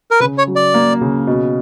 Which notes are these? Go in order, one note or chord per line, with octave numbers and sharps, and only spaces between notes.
A#4
C#3 B4
C#5
F#3
D5
A#3
C#3
B2